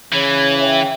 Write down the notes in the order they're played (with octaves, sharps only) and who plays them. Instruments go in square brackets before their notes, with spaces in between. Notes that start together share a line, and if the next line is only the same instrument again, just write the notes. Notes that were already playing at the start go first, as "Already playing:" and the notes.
[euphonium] C#3 [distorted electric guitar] E3 [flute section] C#5
[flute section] C#5 E5 G5